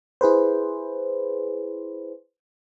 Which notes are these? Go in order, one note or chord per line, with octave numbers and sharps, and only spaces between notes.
E4 G#4 B4 C5